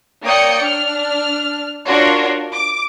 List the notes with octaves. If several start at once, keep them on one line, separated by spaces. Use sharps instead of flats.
A#3 C#5 D5 G5 D#6 C#7
D4 F6
D4 F4 F#4 A#4 C#5
D6